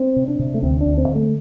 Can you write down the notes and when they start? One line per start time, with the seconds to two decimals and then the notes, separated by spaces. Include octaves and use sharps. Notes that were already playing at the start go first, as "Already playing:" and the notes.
Already playing: C4
0.16 C3
0.28 D4
0.39 C3
0.54 A3
0.63 D2 C4
0.81 D4
0.86 D2
0.98 C4
1.09 D3
1.15 A3